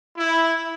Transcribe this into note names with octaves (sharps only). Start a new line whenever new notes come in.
E4